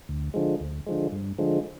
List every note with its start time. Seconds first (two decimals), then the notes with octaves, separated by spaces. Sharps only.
0.09 D2
0.34 D3 F3 G#3
0.60 D2
0.86 D3 F3 G#3
1.12 G2
1.38 D3 F3 G#3